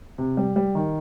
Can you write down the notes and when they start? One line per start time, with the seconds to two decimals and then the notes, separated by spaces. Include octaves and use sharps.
0.18 C3
0.37 G3
0.56 G3
0.75 D#3